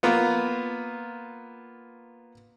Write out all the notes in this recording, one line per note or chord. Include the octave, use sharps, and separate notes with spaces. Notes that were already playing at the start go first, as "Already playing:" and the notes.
A#3 B3 F4